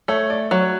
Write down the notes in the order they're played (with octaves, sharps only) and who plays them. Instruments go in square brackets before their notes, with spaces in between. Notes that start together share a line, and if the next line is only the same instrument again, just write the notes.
[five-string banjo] A3 [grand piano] C#5
[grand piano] D5
[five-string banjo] F#3 [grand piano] C#5